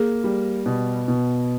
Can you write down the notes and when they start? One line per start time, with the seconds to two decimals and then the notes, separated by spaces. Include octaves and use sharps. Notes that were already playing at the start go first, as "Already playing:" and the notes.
Already playing: A#3 G#4
0.24 G3
0.66 B2
1.08 B2